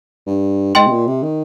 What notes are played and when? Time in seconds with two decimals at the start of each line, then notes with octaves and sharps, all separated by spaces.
0.27 G2
0.75 G#2 D#5 G5 C6
0.87 C3
0.91 A#2
1.07 C3
1.23 D#3